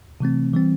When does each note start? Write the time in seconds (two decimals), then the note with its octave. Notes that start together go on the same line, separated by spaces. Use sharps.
0.20 C3 E3 A3 C4
0.53 E3 G3 C4